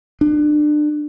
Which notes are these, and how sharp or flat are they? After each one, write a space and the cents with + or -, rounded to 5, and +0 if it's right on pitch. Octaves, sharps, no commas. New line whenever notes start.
D4 +30